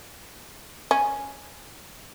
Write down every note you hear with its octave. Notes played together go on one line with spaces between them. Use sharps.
C#4